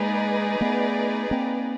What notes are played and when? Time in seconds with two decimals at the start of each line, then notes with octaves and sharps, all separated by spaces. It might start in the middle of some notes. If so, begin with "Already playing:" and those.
Already playing: G#3 A#3 D#4 G#4 B4 D5
0.61 A3 B3
1.31 A#3 C4